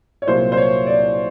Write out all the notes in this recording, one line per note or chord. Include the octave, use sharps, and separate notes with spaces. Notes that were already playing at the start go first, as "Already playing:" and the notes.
C#5
C2 A#2 F#3 A#3 C5
C5
C#5
D5